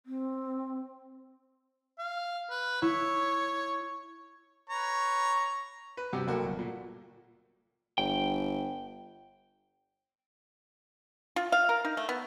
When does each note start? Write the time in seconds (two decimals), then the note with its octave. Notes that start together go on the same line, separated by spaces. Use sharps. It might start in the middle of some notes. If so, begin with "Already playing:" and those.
0.06 C4
1.98 F5
2.50 B4
2.82 E4 C#5
4.70 B4 C#5 A#5
5.97 B4
6.13 G2 C3 F#4 G4
6.27 F#1 A#3 F#4 A4
6.44 G1
6.59 A#2
7.98 G1 G5
11.36 F4
11.52 F5
11.69 A#4
11.85 D#4
11.97 A3
12.09 B3